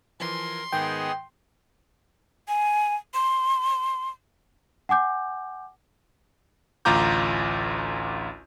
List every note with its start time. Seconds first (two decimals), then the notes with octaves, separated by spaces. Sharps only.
0.20 E3 F3 A#4 C6
0.72 G#2 D#3 B3 G#4 D#5 G5
2.48 G#5
3.14 C6
4.89 F#5 G#5 D6 G6
6.85 A1 D2 F4 A#5 D6 G6